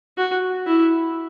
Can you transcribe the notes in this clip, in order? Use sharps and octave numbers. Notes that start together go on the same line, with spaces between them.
F#4
E4